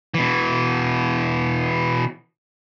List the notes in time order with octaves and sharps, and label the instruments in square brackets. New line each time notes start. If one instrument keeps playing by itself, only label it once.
[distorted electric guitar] B2 E3